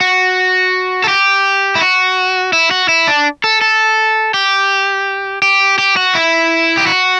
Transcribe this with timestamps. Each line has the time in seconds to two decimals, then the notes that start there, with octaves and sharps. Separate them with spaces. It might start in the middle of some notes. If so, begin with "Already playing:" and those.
0.01 F#4
1.04 A4
1.08 G4
1.75 E4
1.81 F#4
2.53 E4
2.71 F#4
2.89 E4
3.08 D4
3.44 A4
3.61 A4
4.34 G4
5.42 G4
5.78 G4
5.97 F#4
6.15 E4
6.77 G4
6.87 F#4